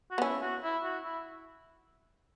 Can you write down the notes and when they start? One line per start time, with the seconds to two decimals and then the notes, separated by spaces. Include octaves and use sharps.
0.11 F#4
0.18 B3
0.22 C#4 E4
0.42 F#4
0.63 E4
0.83 F#4
1.04 E4